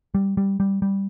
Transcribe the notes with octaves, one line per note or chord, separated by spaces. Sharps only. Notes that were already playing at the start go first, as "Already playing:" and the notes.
G3
G3
G3
G3